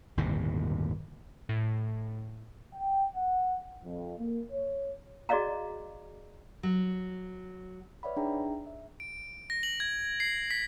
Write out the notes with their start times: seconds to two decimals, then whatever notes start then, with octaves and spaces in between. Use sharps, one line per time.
0.17 G1 D#2 A2 C3
1.49 A2
2.74 G5
3.15 F#5
3.85 F2
4.18 A#3
4.51 C#5
5.29 F#4 G#4 D5 D#5 F5 A#5
6.63 F#3
8.03 B4 C#5 D5 E5 F#5 B5
8.17 D4 D#4 G#4 E5 G5 A#5
8.67 E5
9.00 D7
9.50 A#6
9.63 F#7
9.80 G#6
10.20 C7
10.51 B6